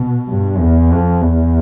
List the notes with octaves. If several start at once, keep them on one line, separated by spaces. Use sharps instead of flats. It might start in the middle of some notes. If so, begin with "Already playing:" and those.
Already playing: B2
G2
E2
F2
E2